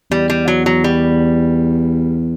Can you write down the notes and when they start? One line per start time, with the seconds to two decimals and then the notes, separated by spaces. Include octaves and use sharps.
0.11 E2 G3
0.30 G3
0.48 F#3
0.66 F#3
0.84 G3